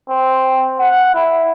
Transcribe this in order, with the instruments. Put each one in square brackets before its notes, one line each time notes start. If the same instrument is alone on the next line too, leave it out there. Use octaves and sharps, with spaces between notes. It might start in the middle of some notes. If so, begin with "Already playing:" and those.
[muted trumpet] C4
F#5
E4